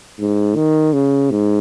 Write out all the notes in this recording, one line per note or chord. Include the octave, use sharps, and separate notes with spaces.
G#2
D#3
C#3
G#2